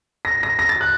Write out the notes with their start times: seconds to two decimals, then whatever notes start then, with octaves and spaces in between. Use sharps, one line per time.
0.25 A#6
0.43 A#6
0.59 A#6
0.69 A6
0.81 F#6